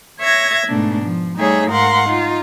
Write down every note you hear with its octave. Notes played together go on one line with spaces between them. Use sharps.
C#5 E5 G#6 A#6
G#2 B2 A3 D4
F3
G3 A3 D#4 G#4 C#5 E5
G#2 A#4 F5 F#5 C6
D#4 F4